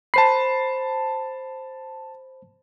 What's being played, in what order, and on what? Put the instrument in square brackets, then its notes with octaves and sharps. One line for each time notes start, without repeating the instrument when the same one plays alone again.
[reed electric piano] C5 B5 [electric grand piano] A5 C7